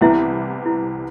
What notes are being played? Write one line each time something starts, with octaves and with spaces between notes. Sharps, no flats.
C2 C3 E3 B3 E4 E5
E4